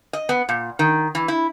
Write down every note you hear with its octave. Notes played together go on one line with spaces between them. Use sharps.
D#5
B3
A#2
D#3
E3
E4